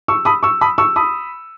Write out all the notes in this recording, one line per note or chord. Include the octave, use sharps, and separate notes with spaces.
C#6 E6
B5 D#6
C#6 E6
B5 D#6
C#6 E6
B5 D#6